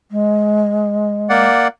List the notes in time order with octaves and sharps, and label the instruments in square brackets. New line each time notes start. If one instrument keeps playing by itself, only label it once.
[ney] G#3
[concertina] A#3 D5 F#5